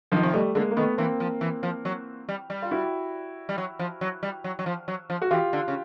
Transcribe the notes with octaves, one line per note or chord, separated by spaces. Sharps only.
B2 D#3 F3
C3
B2 G3 A3
D3 G#3 A#3
A#3
D#3 A3 B3
E3 A#3 C4
F3
E3
F3
F#3
G3
G3
F4
E4 F#4
G3
F#3
F3
F#3
G3
F#3
F#3
F3
F#3
F3
F#4
E3 F4 G4
D3
C#3